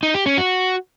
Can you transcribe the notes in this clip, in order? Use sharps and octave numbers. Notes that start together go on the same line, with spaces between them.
D#4
G4
C#4
F#4